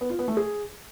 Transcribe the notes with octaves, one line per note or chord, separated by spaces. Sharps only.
B3
F4
B3
A3
G#4